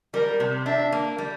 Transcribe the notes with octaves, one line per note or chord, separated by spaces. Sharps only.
G3 A#4
C3
D4 E5
A#3
G3